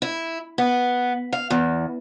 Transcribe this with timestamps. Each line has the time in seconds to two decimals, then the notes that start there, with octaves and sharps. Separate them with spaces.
0.02 E4
0.58 B3
1.33 F5
1.50 E2